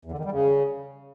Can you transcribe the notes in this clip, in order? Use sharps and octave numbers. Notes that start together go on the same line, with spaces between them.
E2
D3
D#3
G3
C#3